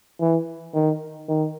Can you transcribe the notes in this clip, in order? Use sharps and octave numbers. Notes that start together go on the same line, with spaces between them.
E3
D#3
D#3